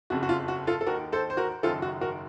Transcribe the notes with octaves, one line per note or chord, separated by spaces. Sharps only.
F#1 F2 C#3 F#4
F#4
F4
F#4
F4 A4
A4
D#2 D#3 F#4 A#4
A4 C5
C5
F#4 A#4
F#1 F#2 D#3 F4 A4
F#4
F#4 A#4